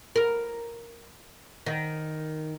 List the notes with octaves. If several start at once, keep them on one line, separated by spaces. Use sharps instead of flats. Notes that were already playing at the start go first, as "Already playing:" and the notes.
A#4
D#3